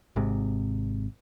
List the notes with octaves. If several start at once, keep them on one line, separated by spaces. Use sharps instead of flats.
G#1 G#2 C3